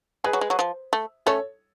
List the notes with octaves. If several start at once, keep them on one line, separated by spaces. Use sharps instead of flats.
G#3 G#4 B4
F#3
G#3
F#3
F3
A3
A3 C#4 A4 C#5